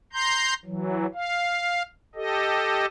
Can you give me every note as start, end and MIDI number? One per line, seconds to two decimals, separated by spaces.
0.13 0.54 82
0.13 0.54 84
0.13 0.54 91
0.65 1.06 52
0.65 1.06 54
1.14 1.82 77
2.15 2.86 67
2.15 2.86 69
2.15 2.86 75